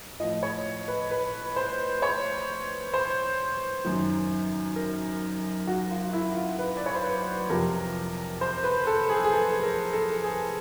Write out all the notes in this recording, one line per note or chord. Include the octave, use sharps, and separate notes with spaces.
A2 F3 D#5
C#5
B4
B4
C5
C#5
C5
F#2 D#3
A#4
F#4
F4
F4
E4
F4
B4
D5
C#5
C5
B4
F2 C3 F3 A#4
C5
B4
A4
G#4
A4
G#4
A4
A#4
A4
G#4